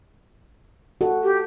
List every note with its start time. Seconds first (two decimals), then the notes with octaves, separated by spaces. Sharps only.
1.01 F#4 A4
1.23 G4